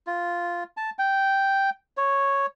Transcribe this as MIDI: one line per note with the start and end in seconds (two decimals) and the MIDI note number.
0.07 0.64 65
0.77 0.90 81
0.99 1.70 79
1.97 2.46 73